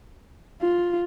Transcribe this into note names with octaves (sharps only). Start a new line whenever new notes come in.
F4